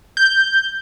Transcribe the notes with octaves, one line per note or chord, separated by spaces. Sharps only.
G6